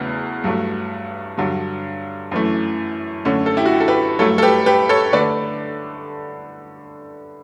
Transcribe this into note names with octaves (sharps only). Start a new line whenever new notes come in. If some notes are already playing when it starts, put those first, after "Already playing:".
Already playing: E2 C#3 F#3 A3
G2 F#3 A3
G2 D3 F#3
F#2 E3 A3
F#2 D3 A3 C#4
A4
E4 G4
F#4
G4
A4
G4 B4
G2 F#3 A3 A4 C#5
A4
G4 B4
G4 B4
A4 C#5
D3 A3 B4 D5